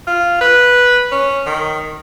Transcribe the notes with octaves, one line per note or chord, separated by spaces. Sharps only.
F4
B4
C#4
D#3